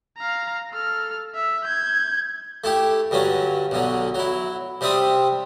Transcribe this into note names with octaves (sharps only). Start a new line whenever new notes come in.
F5 A#5
A4 F6
E5
G6 G#6
A3 E4 G4
G2 D3 F#3 C#4
B1 D3 F#3
F#3 E4
C3 G3 C4 E5 D#6